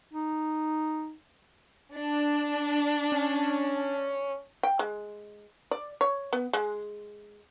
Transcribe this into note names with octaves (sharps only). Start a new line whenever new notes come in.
D#4
D4
C#4
G5
G#3
D5
C#5
B3
G#3